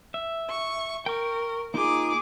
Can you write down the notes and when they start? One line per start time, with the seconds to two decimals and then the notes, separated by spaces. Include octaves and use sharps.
0.14 E5
0.50 C#6
1.06 A#4 G5 C#6
1.74 A#3 D#4 F4 G#4 D6